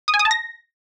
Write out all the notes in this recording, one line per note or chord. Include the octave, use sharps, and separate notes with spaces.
D#6
G#5
D#6
A5
A#6